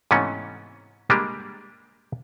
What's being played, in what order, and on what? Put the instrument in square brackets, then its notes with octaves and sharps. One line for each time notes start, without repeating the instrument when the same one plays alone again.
[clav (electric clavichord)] G#2 C3 E3 A3 B3 C#4
G3 G#3 A#3 D4 G4